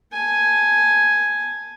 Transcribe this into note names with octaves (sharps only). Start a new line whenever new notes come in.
G#5 A5